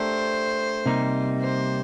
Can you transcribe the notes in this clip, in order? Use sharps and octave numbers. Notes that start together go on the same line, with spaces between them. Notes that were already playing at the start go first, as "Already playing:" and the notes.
Already playing: A3 D4 G4 A#4 C5
C3 G3 A#3 D#4
C5